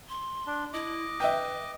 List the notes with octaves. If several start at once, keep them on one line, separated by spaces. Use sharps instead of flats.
C6
D4
E4 D#5 D6
B4 E5 G5